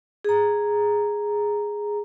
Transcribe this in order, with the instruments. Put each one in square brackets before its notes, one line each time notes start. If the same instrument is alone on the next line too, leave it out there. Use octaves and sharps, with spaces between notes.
[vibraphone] G#4 A#5